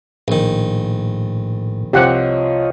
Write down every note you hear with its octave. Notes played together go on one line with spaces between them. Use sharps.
A#1 A2 D#3
C2 F3 C4 F4 G4 C#5 D#5 F#5